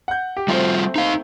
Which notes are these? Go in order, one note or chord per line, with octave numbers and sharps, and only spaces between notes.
F#5 G6
G4
G3 A3 C4 F4 C5
D#4 F5